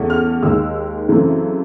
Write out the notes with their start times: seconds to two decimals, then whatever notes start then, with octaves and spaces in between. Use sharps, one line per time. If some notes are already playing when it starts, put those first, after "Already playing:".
Already playing: E2 C#3 E3 A3 C#4
0.10 F6
0.43 D#2 D#3 G#3 E6
1.09 F#2 C#3 E3 A3 C4